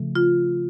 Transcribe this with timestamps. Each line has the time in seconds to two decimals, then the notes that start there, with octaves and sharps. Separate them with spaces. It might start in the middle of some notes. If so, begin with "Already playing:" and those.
Already playing: C#3 F3 A3
0.15 F4